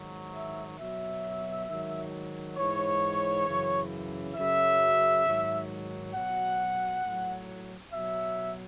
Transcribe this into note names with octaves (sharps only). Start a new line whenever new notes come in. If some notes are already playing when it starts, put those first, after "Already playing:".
Already playing: G#2 D#3 F#3
E5
B2 F#3 E5
G#2 D#3 F#3
G#2 E3 C#5
F#2 C#3 E3
F#2 C#3 F#3 E5
G#2 D#3 F#3
B2 F#3 F#5
A2 F#3
B2 F#3 E5